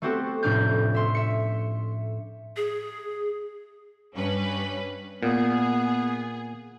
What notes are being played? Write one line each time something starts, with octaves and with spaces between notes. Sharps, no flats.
A3 B3 C4 F#4 G4 A4
F1 A2 C#4 D4 F6 G6
E5 C6
E5 C#7
G#4
G2 C#4 B4
A#2 B3 G#4